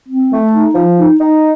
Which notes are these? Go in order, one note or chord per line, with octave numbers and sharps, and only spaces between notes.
C4
A3
D#4
F3
D#4
D#4